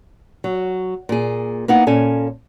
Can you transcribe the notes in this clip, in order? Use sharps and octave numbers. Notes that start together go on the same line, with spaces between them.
F#3
A#2 G#4
A#3 B3 D#4 E4 F#5
A#2 C#4 A4 G#5